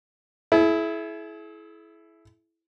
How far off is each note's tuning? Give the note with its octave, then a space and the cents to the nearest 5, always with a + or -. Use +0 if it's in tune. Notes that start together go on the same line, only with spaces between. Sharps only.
E4 +0 G#4 +45